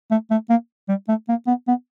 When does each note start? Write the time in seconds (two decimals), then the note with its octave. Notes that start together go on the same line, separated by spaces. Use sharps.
0.11 A3
0.31 A3
0.50 A#3
0.89 G3
1.08 A3
1.29 A#3
1.47 B3
1.68 B3